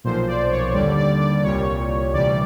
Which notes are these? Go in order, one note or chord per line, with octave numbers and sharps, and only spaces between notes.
B1 A#2 F3 C5
D5
C#5
D#2 D3 G3 D5
D5
D5
C2 A#2 G3 C#5
D2 C3 E3 G3 D5